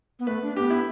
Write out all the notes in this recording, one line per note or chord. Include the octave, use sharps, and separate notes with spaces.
B3
A3 B4
D4
B3 G4
E4